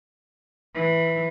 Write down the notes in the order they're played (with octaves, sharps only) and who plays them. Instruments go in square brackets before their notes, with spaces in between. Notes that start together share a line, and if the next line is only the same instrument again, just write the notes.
[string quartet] E3